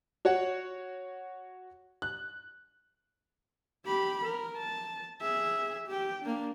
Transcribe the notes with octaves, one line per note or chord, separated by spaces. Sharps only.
F#4 C#5 F#5
F#6
G4 B5
A#4
A5
G#4 E5
G4 G5
A#3 D4